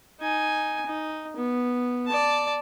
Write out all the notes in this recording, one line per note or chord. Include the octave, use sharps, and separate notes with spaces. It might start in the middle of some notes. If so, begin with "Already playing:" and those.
D#4 G#5
D#4
B3
D5 A5